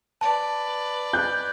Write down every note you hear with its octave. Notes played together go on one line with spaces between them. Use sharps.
B4 D5 A5
F#6 G6